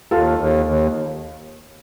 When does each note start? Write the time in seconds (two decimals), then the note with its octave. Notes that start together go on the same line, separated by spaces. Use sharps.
0.11 D#2 F4 A4
0.39 D#2
0.66 D#2